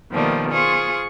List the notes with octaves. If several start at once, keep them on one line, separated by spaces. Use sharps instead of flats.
B2 D#3 F3 G3 A3 A#3
F4 G#4 C5 C#6